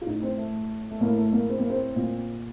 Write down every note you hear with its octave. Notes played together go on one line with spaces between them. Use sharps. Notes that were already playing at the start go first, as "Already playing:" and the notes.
F4
A2 D#4
C4
A3
A3
A2 A#3
A3
A#3
C4
A#3
C4
A#2